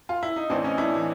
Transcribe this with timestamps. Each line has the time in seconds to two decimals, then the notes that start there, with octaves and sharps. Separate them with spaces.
0.09 F4
0.23 E4
0.36 D#4
0.50 A1 A2 E3 C4 D4
0.63 C#4 D#4
0.77 D4 E4
0.93 A2 E3